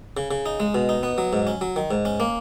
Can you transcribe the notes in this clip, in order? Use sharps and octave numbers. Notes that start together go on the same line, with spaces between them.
C#3
C#3
D#4
G#3
B2
D#4
B3
F#3
G#2
C#4
F#3
D#3
G#2
C#4
A#3